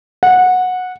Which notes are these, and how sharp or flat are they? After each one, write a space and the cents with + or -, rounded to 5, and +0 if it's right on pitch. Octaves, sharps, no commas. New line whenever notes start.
F#5 -15